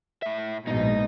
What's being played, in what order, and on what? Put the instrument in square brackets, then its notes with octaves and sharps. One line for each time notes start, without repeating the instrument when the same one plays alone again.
[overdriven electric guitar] A2 E5
[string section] A#1 G#2 B2 [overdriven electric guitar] D#4 D#5